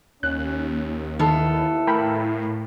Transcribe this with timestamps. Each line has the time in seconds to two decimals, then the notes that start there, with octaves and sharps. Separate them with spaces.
0.23 D#2 C#4 F#6
1.19 D#3 B3 E4 F4 A4
1.87 A2 A#4 G5 B5